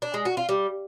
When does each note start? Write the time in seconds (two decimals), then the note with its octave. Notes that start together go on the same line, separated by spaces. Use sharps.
0.02 D4
0.14 G#3
0.25 F#4
0.37 F4
0.49 G3